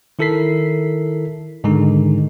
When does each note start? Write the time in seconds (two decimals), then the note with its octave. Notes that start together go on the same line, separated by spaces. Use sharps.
0.19 D#3 E4 A4 A#4 B6 C7
1.64 G#2 D3 D#3 G#3 D#4